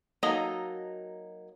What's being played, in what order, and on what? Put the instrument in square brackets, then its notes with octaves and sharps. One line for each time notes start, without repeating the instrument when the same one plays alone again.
[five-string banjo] F#3 A#3 D#4 A4 D#5